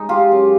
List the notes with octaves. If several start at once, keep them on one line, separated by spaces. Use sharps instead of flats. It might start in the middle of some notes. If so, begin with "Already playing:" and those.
Already playing: G#3 D#4
F4 G4
F#2